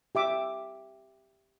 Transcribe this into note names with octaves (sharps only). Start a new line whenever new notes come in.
G4 E5 D6